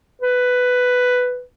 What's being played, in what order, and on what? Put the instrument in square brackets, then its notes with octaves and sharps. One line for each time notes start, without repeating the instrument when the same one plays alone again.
[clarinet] B4